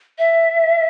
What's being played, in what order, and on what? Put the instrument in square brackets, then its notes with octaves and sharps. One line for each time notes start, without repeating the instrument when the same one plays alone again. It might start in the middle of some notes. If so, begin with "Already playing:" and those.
[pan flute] E5